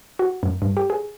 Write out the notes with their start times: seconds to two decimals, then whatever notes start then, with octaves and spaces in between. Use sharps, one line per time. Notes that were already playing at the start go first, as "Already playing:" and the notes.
0.19 F#4
0.43 F#2
0.62 G2
0.77 G4
0.90 G#4